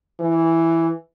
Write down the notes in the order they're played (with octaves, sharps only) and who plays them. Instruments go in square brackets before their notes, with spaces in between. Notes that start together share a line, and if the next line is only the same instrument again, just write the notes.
[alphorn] E3